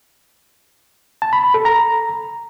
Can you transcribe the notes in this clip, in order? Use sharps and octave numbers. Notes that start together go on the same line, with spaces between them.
A5
B5
B5
A4
A#5